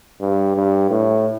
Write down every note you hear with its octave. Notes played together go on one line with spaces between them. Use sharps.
G2
G2
A2